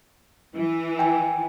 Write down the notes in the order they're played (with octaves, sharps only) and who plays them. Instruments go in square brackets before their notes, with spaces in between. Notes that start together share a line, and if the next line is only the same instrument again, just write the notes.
[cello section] E3
[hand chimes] G5 G#5